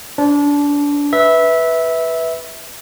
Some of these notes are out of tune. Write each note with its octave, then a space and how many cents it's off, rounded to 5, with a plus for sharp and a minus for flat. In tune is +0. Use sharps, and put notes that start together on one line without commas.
D4 -25 C5 +0
B4 +0 E5 -15